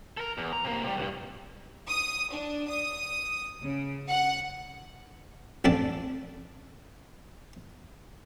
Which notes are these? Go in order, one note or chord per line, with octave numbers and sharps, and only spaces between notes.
A4 A#4
E2
A#5
C3 A#3
C3 G3
C#2 G2
D#6
D4
D#6
C#3
F#5
A1 F2 D4 A4 A5